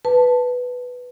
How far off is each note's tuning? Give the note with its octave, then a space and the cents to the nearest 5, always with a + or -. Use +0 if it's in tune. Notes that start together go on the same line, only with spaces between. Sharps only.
B4 +0 A5 +0